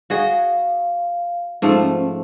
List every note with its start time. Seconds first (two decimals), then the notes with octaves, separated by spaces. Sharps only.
0.10 F#4 G#4 D#5 F5
1.62 G#2 F3 A3 C#4